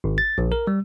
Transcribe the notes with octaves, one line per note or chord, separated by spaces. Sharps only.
G#1
A6
A#1
A#4
G3